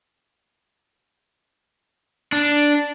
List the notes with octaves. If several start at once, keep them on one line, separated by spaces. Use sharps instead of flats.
D4